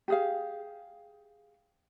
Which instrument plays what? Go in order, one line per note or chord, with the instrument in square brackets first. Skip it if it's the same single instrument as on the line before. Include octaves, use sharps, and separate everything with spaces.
[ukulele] G4 G#4 F5